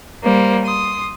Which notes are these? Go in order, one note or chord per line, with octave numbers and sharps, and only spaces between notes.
G3 A#3 C5
C6 D#6